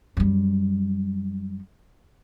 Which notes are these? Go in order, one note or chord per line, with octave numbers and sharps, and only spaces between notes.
F#2 G3